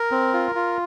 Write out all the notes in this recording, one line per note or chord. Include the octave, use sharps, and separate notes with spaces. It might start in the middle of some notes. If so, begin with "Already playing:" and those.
Already playing: A#4
C4
F4
F4